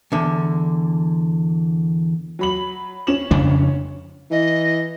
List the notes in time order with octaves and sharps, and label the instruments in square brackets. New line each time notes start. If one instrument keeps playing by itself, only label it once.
[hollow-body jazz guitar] E2 D3
[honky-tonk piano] F#3 B5 F#7
C#4 E7 F#7
[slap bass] F2 C#3 D4
[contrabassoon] E3 [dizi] D#5